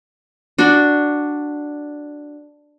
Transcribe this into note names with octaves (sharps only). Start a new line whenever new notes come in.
D4 F#4